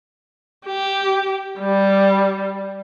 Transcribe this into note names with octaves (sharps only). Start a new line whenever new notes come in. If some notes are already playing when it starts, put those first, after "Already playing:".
G4
G3